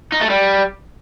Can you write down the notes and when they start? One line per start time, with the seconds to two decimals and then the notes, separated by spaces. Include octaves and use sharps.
0.12 D#4
0.21 A3
0.30 G3